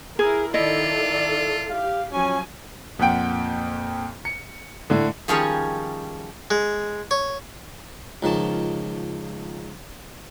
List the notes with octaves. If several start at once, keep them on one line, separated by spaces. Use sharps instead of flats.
E4 G#4 A#4
D#3 E4 F4 A4 D5 D#5
G4 F5
F3 F#3 C#4 G#5
F2 A#2 F#5 G5 D7
C#7
A2 D3
D#3 F3 G3 C#4 G#4 C#5
G#3
C#5
C#2 D#3 F3 A5